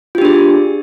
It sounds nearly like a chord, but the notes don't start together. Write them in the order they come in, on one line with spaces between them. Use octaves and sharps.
F4 G4 D4 G#4